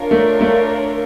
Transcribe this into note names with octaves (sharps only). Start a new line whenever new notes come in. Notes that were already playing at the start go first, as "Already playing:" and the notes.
Already playing: D4 F4 A#4 C#5
A3
A3